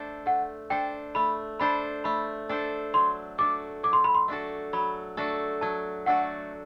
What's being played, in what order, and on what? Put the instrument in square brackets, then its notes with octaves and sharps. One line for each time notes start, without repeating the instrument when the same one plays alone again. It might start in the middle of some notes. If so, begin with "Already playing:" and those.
Already playing: [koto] A3 D4 A4 C5
[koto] A3 [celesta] F#5
[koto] D4 A4 C5 [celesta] G5
[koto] A3 [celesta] B5
[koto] D4 A4 C5 [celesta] B5
[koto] A3 [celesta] B5
[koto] D4 A4 C5
[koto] F#3 [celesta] C6
[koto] A3 D4 F#4 A4 [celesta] D6
[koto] F#3 [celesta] D6
[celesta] C6
B5
C6
[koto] A3 D4 F#4 A4
[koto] F#3 [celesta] B5
[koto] A3 D4 F#4 A4
[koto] F#3 [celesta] A5
[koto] A3 D4 F#4 A4 [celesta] F#5